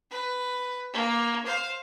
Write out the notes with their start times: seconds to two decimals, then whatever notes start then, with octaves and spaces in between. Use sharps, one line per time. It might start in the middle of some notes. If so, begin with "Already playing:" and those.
0.11 B4
0.93 A#3
1.46 C5 F5